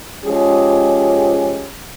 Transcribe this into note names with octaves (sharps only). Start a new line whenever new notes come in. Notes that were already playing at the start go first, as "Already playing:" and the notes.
F3 G#3 C#4 G4 G#4